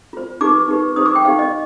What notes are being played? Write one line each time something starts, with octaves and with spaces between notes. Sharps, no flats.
F4 C5
D#4 G4 B4 D6
D#4 G4 B4
D#4 G4 C5 D#6
D6
G5
D#4 G4 C5 F5
D#5